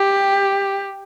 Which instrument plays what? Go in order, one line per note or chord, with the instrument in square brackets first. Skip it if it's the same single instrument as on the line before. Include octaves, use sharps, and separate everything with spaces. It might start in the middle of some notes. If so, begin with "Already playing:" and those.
Already playing: [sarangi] G4